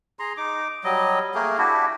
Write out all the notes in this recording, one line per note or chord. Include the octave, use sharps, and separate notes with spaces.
G#4 A#5 C6
D#4 D6
F#3 G3 D#5
A3 A#3 G#4 A#4
D4 E4 F#4 G4